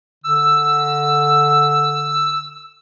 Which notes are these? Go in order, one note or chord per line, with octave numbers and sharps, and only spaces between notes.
D3 E6